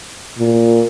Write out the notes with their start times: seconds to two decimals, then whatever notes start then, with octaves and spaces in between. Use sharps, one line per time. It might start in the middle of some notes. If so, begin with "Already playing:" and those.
0.38 A#2